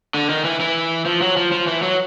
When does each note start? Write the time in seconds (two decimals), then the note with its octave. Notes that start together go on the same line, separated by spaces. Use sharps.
0.14 D3
0.29 D#3
0.45 E3
0.60 E3
1.06 F3
1.22 F#3
1.37 F3
1.52 F3
1.67 E3
1.82 F#3